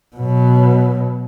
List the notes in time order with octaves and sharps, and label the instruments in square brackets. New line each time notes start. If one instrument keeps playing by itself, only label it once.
[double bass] B2 F#3